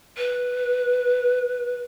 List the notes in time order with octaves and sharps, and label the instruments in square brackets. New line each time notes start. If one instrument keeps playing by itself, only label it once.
[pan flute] B4